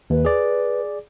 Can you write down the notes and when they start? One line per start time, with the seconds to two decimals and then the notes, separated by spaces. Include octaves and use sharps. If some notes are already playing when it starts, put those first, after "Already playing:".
0.10 D#2 B4
0.25 G#4 D5